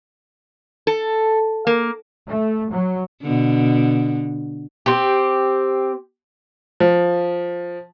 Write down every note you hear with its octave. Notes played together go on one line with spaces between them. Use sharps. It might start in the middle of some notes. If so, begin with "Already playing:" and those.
A4
A#3
A3
F#3
B2 D3
C4 G4
F3